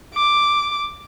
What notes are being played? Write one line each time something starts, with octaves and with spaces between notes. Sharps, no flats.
D6